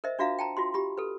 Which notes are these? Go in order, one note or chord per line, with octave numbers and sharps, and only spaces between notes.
A#4 C5 D#5 E5
D4 F4 F#4 E5 F5 A#5
G5 A5 A#5
F4 F#4 C6
F4 G4 B5
A4 B4